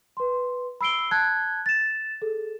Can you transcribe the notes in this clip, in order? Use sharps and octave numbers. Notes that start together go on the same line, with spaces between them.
B4 C6
B5 E6 C7 D7 G7
A5 F#6 G#6
A6 E7
G#4 A4